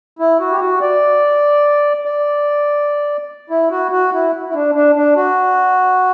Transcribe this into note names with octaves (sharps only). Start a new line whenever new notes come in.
E4
F#4
G4
F#4
D5
D5
E4
F#4
F#4
E4
E4
D4
D4
D4
F#4